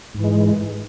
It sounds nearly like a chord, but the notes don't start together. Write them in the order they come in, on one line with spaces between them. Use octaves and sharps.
G#2 E3 G#3